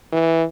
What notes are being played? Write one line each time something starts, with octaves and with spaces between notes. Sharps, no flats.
E3